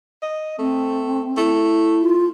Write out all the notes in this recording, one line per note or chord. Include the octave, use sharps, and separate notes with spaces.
D#5
A3 C4
A3 E4
F4